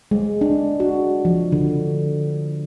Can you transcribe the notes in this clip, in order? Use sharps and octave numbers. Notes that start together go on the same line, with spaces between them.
G#3
D4
F#4
F3
D3